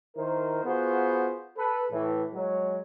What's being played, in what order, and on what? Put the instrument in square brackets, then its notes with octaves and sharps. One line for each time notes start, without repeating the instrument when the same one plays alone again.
[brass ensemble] D#3 E4 A#4 C5
B3 F4 F#4 G#4 C5
A4 B4
A2 E3
F#3 G#3 C#5